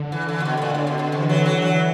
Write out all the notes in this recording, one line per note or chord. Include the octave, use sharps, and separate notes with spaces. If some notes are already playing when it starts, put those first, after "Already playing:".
Already playing: D3
E3
E3
A#2
B2
B2
A#2 D3
A2
B2
B2
C3 E3
F#3
F#3
E3 F#3